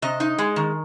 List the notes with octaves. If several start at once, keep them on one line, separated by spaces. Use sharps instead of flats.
C3 D#5
D#4
G#3
D#3